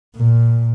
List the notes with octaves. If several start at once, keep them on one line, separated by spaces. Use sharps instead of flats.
A#2